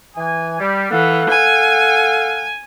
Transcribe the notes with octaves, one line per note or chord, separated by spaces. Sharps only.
E3 G#5
G3
E3 A4 F5 F#5
G#5